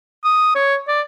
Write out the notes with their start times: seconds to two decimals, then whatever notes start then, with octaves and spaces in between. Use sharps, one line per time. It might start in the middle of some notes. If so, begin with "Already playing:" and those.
0.24 D#6
0.55 C#5
0.88 D5